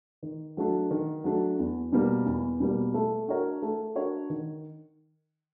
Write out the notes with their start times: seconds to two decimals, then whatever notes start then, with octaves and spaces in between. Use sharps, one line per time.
0.23 D#3
0.57 F#3 A3 D4
0.91 D#3
1.24 F#3 A3 D4
1.59 E2
1.92 B2 G3 A#3
2.26 E2
2.60 B2 G3 A#3
2.94 A3
3.28 D4 F#4 A#4 C#5
3.62 A3
3.95 D4 F#4 A#4 C#5
4.30 D#3